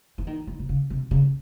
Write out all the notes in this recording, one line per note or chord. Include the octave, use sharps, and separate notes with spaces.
E3
D#3
E3
C3
C#3
C3
C#3